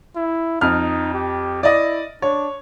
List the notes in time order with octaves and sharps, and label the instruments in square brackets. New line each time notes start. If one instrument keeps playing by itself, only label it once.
[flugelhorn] E4
[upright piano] F2 F6 [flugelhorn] D#4
[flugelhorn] G4
[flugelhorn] E4 [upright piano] D5 D#5
[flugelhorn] D4 [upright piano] C#5